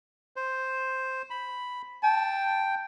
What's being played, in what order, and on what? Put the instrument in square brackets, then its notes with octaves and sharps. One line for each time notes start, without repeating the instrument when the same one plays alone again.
[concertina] C5
B5
[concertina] G5 [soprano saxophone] A5